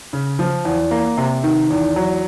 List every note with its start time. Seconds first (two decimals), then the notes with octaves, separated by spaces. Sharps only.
0.13 C#3
0.39 F3
0.65 E2
0.91 A#3
1.17 C3
1.44 D#3
1.70 E2
1.96 F#3